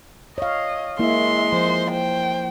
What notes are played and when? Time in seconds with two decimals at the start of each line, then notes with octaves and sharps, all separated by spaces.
0.38 C#5 D#5 F5
0.99 G#3 A#3 E4 E5 C6
1.53 F3 C5
1.91 C5 G5